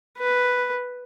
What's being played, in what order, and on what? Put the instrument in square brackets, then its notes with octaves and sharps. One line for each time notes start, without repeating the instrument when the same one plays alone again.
[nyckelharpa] B4